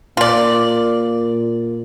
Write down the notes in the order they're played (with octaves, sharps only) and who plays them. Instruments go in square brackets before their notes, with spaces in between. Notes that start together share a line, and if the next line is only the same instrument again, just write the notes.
[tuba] A#2 [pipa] F4 D5